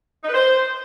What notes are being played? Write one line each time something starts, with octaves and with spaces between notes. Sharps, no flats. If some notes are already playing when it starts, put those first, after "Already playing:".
D#4
B4
C5